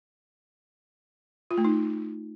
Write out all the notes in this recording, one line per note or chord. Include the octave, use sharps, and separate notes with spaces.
F4
A3
D#4